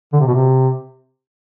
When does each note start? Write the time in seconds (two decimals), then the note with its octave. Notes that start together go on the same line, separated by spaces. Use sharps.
0.13 D3
0.20 C3
0.27 B2
0.35 C3